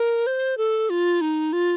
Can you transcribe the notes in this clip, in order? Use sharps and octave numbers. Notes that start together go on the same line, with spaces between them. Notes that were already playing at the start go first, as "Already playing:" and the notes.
Already playing: A#4
C5
A4
F4
D#4
F4